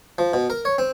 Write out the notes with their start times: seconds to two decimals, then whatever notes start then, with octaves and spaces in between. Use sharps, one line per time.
0.18 F3
0.33 B2
0.50 A#4
0.65 C#5
0.78 C4